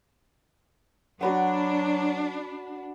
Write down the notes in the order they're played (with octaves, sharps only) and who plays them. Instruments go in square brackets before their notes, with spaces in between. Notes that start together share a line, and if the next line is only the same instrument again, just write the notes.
[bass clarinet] F#3 [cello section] D4 [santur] F#4 B4 F#5